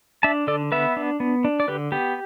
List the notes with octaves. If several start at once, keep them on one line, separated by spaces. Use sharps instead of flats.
D4 E5 A5
D3 A4 D5
B3 B4 E5
D4
B3
D4
D5
D3 G4 B4
B3 G4